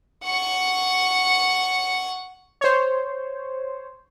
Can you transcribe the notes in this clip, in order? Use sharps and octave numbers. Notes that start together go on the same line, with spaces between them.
F#5 C#6
C5 C#5